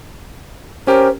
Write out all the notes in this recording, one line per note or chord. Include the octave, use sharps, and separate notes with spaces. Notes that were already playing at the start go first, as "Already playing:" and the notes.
C#4 G4 A#4 C5